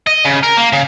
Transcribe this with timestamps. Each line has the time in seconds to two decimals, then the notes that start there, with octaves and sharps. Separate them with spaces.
0.07 D#5
0.25 C#3
0.43 A#4
0.57 A#3
0.73 C#3